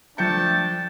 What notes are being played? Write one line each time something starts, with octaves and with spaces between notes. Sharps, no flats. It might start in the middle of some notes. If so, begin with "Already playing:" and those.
F3 A3 D4 G5 A5 G6 C#7